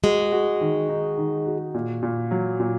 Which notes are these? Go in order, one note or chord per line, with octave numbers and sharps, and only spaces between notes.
G#3 F#4
F#4
D#3
D#4
D#3
F#4
A#2
A#2
F#3
A#2